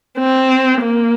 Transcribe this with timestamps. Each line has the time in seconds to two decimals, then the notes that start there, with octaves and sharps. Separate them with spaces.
0.18 C4
0.81 A#3